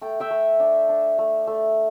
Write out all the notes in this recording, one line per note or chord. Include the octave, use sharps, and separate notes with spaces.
A3 G5
E5 G5
A3
D4
D4
A3
A3